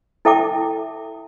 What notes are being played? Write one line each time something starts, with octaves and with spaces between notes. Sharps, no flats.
E4 A4 E5 G5 A5 D6